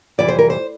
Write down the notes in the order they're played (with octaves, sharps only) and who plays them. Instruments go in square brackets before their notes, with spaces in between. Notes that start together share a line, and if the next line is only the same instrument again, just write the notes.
[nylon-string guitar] F2 C3 E3 G3 D5
C5
A#4
C5